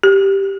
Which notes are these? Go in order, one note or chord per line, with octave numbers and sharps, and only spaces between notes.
G4